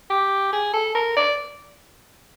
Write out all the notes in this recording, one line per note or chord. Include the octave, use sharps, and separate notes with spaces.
G4
G#4
A4
A#4
D5